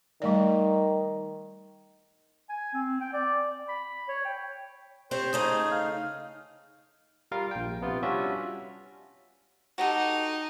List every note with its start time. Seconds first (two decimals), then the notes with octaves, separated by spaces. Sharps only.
0.22 D#3 G3 A3 D5
2.49 G#5
2.73 C4
3.01 G5
3.13 D5
3.48 D5
3.68 B5
4.08 C#5
4.25 G5
5.11 C4 G4 C5 C#5
5.33 C#3 A3 D#4 G#4
5.72 F5
7.32 G3 F4 A#4 F5
7.51 A#1 G5
7.82 C3 B3 F4
8.03 G3 C#4 D4 F4 F#4 E5
9.78 D#4 F#4 G4 A4